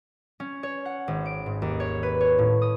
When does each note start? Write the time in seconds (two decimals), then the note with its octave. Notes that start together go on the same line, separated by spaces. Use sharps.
0.40 C#4
0.63 C#5
0.85 F#5
1.08 G#1
1.26 D7
1.46 G#2
1.62 D#2
1.80 C#5
2.03 B4
2.21 C#5
2.39 A2
2.62 D#6